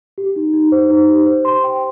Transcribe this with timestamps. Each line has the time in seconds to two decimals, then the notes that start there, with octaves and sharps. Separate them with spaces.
0.18 G4
0.36 D#4
0.53 D#4
0.72 C5
0.90 D#4
1.09 G4
1.26 C5
1.45 C6
1.64 G5